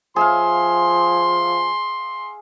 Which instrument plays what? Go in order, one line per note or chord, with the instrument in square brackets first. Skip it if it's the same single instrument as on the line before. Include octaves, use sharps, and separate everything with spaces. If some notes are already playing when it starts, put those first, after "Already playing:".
[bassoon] F3 [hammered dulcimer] G#4 E5 F5 [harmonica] C6